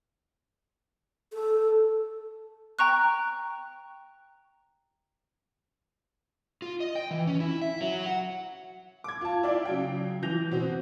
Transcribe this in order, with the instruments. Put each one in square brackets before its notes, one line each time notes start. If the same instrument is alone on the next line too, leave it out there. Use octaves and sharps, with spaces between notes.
[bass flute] A4
[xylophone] G5 A#5 C#6 F#6
[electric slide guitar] F4
D#5
G5
E3
C#4
E4
E5
F#3
F#5
[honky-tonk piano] D6 G#6
F4 A5
E4 D5 F5 G5
C#3 F#3 G5
E3 G6 A#6 F7
B2 C4